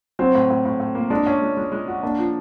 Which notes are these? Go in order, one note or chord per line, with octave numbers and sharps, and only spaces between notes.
F#3 C4
A2
A2
A2
A2
A#3
G#3 D4
C#4
G#3
G#3
G#3
F#4
A#3 D4
F3